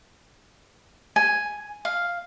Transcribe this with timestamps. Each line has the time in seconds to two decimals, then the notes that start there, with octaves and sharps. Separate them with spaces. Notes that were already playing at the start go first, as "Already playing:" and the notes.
1.16 G#5
1.85 F5